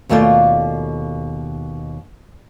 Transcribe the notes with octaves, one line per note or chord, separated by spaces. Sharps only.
D#2 B2 A3 F4 D5